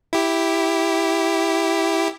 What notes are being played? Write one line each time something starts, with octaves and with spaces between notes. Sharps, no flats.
E4 G4